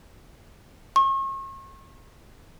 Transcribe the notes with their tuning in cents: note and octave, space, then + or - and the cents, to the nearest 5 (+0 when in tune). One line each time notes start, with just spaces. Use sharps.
C#6 -40